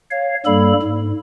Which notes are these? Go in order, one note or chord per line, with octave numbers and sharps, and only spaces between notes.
C#5 F5
G2 G3 A#3 A4 B5
G#2